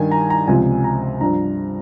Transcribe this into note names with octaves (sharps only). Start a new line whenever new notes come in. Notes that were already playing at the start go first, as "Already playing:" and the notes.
Already playing: G2 D#3 G#5
A#5
A#5
C#2 C3 F3 G#5
A#5
G2 F3 A#5